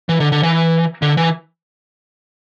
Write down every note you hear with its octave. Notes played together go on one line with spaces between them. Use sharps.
E3
D3
D3
E3
D3
E3